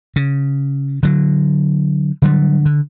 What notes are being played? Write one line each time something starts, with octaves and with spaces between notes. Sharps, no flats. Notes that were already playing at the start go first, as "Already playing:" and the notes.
C#3
D3 F#3
D3 F#3 G3
D3